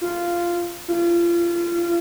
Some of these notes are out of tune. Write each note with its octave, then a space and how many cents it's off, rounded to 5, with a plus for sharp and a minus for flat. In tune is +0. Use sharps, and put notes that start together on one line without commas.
F4 -10
F4 -30